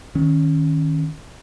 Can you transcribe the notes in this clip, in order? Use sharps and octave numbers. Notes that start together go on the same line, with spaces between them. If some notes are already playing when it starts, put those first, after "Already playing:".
D#3 C#4